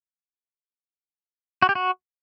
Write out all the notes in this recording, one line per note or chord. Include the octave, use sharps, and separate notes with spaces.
F#4
G4
F#4